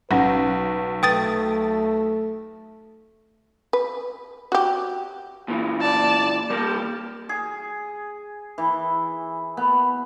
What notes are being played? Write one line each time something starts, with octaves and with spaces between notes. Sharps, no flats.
B1 C#4 B4 F#5
A3 B4 G5 D#6 A6
B4
F#4 G4
A#2 E3
D5 A5
G3 A#3 G4
G#4
E3
B3